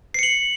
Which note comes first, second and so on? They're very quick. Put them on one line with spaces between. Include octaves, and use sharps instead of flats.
C7 C#7 F#7